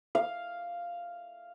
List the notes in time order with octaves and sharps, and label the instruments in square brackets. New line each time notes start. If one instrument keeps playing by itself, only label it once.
[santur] F5